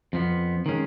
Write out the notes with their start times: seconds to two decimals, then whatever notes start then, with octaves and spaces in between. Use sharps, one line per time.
0.13 F2 F3 B3
0.66 D#3 G#3 C#4